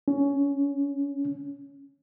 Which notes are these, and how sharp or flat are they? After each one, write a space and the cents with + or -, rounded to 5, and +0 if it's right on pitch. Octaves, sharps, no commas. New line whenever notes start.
C#4 +15